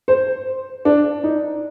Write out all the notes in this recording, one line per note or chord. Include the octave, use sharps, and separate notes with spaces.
C5
D4
D#4